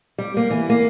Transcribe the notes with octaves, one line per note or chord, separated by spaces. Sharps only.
G3
A#3
E3
A#3